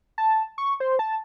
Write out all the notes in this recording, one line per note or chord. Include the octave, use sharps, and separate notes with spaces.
A5
C#6
C5
A5